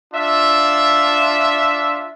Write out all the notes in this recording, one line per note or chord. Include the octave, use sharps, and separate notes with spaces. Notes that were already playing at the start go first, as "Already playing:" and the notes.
D4 F4 E5